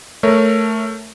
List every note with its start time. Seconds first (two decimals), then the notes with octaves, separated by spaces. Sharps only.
0.23 A3 A#4 C#5